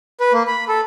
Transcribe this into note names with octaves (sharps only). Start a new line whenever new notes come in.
B4
A#3
B5
A4